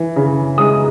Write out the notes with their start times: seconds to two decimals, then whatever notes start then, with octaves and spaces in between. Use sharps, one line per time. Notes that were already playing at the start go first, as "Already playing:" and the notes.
Already playing: E3
0.16 C#3
0.58 G#3 D#6